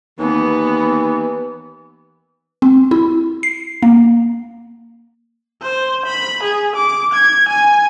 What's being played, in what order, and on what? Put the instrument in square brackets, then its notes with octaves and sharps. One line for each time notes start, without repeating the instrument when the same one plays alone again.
[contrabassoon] D#2 [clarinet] E3 [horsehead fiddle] B3
[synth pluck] C4
E4
C7
A#3
[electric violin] C5
B5
G#4
D6
G#6
G#5